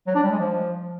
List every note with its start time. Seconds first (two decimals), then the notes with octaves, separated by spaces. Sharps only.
0.07 F#3
0.15 D4
0.23 G3
0.31 G#3
0.39 F3